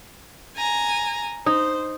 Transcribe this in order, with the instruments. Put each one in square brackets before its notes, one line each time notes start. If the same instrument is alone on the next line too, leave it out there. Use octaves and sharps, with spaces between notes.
[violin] G#5 A#5
[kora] D#4 [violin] C5